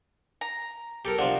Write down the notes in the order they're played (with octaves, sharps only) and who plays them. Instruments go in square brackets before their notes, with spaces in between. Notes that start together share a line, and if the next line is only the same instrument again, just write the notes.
[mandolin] A#5
[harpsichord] G4 A4 A#4 [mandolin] A5
[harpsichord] C3 F3 D4 [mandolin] F#4